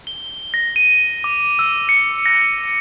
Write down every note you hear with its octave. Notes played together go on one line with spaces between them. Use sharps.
G7
A#6
D#7
D6
E6
C#7
A#6